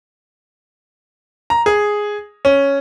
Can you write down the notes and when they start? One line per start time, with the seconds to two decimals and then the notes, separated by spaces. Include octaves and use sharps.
1.50 A#5
1.66 G#4
2.45 C#4